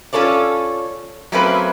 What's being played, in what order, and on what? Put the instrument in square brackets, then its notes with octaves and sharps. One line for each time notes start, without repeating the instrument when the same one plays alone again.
[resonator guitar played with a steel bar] C#4 F4 A4 C#5 D5
F#3 A3 A#3 C4 C#4 B4